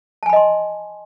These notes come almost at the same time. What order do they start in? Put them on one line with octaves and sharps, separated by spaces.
A5 G#5 B5 D#5 C6